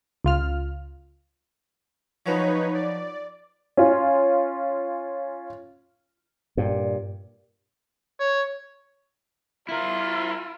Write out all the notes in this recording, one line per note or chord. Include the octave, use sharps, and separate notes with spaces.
C#2 F4 F6
F3 F#3 D#4 B4 C#5 A#5
D5
C#4 F4
G2 A#2
C#5
E4 F4 A#4